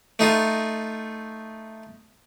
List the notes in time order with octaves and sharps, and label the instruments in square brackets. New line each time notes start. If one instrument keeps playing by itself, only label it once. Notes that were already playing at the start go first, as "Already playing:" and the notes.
[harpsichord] A3 D#4 F4